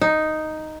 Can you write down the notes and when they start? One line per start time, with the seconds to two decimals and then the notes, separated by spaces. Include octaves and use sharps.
0.02 D#4